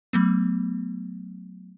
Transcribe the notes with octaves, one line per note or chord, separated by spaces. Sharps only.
F#3 A3 B3